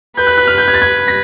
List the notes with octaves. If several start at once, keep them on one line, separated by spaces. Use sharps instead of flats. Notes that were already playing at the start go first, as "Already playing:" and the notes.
B4 G6
F#6
F#6
F6
G6
G#6
A6
G#6
A#6